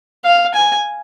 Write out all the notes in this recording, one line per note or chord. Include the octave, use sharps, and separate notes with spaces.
F5
G#5